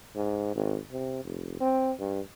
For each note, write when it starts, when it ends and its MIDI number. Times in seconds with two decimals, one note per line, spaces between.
0.16 0.54 44
0.56 0.79 32
0.92 1.23 48
1.24 1.56 29
1.60 1.92 60
1.99 2.20 43